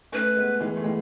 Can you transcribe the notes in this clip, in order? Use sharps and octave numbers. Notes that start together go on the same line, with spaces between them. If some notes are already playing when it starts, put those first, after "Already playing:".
A3 C#4 B4
G#3 B3
E3 G#3
A3
E3 G#3